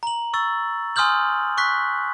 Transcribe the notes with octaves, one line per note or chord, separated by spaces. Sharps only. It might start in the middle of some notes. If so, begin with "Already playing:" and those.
A#5 F#7
C#6 E6 A6
G#5 C6 D#6 F6 G6 F#7
C#6 F#6 B6